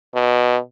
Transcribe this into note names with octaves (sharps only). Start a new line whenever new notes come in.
B2